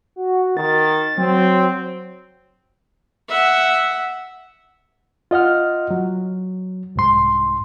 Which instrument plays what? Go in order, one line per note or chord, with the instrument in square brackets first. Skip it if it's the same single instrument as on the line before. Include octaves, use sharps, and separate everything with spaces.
[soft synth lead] F#4
[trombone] D#3 [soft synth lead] A6
[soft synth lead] F#3 [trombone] C4
[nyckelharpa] E5 F#5
[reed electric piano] F4 D#5 F#5 F6
F#3
C2 G#2 C6